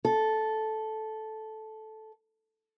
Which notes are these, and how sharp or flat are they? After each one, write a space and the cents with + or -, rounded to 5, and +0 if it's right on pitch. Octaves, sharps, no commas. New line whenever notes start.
A4 -10